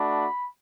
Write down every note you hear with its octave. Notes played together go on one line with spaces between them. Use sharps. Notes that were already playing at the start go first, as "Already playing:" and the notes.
Already playing: A3 D4 F#4 B5